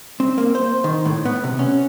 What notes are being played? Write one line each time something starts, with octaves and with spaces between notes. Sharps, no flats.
C4
A#3
C5
D#3
A2
B3
C3
C#4